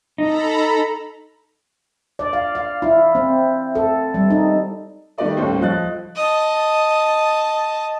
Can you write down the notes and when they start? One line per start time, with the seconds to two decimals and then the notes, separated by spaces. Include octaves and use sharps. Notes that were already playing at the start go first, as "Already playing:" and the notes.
0.18 D#4 A4 A#5 B5
2.19 D5
2.33 F5
2.55 F5
2.82 E4
3.15 C4
3.75 A4
4.14 G3
4.30 D#4
5.18 D#3 A3 G4 B4 D5 D#5
5.37 D#2 A2 G3 C#4 A4 C5
5.60 C#2 F3 D#5 F#6 A6
6.16 D#5 A5